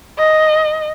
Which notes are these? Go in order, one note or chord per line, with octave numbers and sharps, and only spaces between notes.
D#5